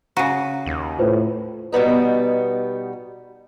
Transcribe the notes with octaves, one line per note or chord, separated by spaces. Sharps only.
C#3 F#4 A#5 D#7
D#2
A2 F4 B4 C5
B2 G3 B3 D#4